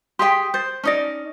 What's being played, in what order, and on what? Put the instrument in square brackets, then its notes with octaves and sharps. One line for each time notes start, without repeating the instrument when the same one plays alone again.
[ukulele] G4 G#4 G5 [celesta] C6 D#6 B6
[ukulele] C5 [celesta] G6 A6
[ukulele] C#4 D#4 D5 [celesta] A5 A#6